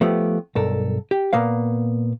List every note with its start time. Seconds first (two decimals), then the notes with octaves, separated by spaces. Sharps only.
0.01 F3 A3 B3 G4
0.55 B1 G2 A4 A#4
1.11 G4
1.33 A#2 A#3 B3 F5